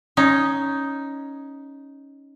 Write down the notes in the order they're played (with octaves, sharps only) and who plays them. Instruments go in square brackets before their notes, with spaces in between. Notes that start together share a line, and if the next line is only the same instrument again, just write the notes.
[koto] C#4 D#4